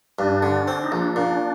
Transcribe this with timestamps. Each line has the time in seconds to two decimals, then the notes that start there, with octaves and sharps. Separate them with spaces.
0.19 G2 D4
0.43 D3
0.68 C4
0.84 D#4
0.92 A#1 D4
1.16 A#2